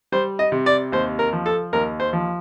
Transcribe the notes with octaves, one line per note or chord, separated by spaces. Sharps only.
G3 C5
D#5
C3
D5
D#2 C5
A#4
F3
A4
D#2 A#4
C5
F3